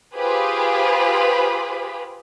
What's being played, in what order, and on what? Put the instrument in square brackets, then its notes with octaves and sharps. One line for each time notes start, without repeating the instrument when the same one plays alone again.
[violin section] F4 G4 G#4 B4 C5 B5